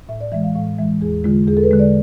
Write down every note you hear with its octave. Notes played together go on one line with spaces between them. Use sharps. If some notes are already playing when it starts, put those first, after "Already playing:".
A2 E5
D5
E3 G#3 E5
F5
A2 F5
E3 G#3 E5
E2 G#4
D3 G#3 F4
E2 G#4
A4
B4
D3 G#3
D5